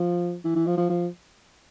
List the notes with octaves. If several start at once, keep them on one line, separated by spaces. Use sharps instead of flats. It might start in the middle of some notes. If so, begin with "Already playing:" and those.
Already playing: F3
E3
E3
F3
F3
F3